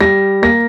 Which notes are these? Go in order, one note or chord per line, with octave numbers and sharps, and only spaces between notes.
G3 A#6
A#3 A#6